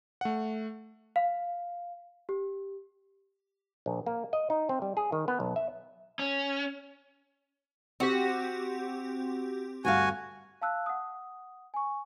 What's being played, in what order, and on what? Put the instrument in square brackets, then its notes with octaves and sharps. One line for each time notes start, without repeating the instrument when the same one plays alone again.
[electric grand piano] A3 F#5
[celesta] F5
G4
[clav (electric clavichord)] A#1
A#3
D#5
D#4
C4
G3
G#4
D#3
B3
B1
E5
[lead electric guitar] C#4
[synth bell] C4 G4 [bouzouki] F#4
[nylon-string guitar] D2 G2 F5 [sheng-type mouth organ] F#4 G#5
[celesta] F5 A5 E6 F#6
F#5 D#6
G#5 C#6